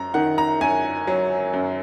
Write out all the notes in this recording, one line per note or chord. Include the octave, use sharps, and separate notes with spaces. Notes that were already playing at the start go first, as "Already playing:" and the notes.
Already playing: F#2 A#5
D#3 F#5
A#5
F#2 G#5
F#3
F#2